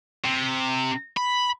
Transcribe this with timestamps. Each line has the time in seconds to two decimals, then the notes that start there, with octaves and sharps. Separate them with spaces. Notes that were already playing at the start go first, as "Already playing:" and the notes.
0.25 C3
1.17 B5